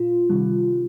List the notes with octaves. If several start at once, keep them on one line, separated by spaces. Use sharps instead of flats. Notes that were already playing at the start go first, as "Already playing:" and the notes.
Already playing: A#2 F4
C3 D#3 G3